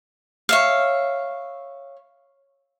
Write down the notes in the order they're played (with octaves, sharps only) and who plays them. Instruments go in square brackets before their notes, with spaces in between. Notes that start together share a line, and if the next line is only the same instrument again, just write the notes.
[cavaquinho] C#5 E5 F5